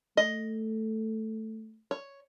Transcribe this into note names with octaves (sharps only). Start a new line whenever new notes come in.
A3 D#5
C#5